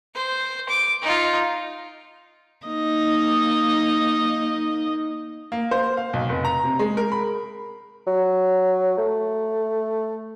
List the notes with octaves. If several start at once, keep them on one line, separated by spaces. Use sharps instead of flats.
C5
D6
D#4 F4
A#3 D#4 D#5
A#3
C5
F5
B1
F1
A#5
C3
G#3
A#4
B5
F#3
A3